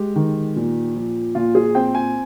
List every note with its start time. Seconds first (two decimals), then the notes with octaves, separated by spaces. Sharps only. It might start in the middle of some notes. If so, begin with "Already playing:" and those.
Already playing: G#3 G4
0.16 D#3
0.56 A#2
0.96 F3
1.35 A#2 F4
1.55 G#4
1.75 C4 G5
1.95 G#5